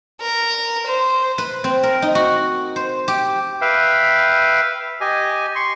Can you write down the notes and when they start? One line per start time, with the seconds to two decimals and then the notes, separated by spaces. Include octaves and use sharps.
0.21 A#4
0.87 C5
1.38 B4
1.64 C4
1.83 A#4
2.02 D#4
2.15 F#4
2.76 C5
3.08 G4
3.61 B4 E5 F5 G5
5.01 G4 D#5 G#5
5.56 C6 C#6